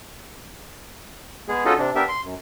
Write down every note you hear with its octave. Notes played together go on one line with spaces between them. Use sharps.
G#3 B3 G#4
C#4 D#4 F4 F#4 A4 D#5
C3 D4
B3 D4 G4 A#4 E5
C6
F#2